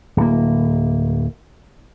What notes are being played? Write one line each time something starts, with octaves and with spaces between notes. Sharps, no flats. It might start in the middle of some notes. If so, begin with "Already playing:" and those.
D1 A#3